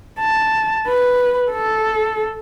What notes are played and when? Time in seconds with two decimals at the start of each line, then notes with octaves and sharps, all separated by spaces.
0.20 A5
0.87 B4
1.51 A4